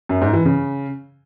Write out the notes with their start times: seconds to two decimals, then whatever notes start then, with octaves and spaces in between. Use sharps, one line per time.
0.09 F#2
0.21 G#2
0.33 E3
0.45 C#3